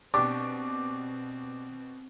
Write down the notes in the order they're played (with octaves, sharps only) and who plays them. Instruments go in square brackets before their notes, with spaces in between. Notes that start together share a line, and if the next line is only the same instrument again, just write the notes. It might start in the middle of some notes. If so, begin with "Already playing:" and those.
[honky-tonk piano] B2 C#6 [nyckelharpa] C4 [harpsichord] D4 G4 [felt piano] D6